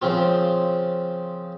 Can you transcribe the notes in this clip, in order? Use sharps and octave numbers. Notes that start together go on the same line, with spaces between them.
C#3 F3 C4 F4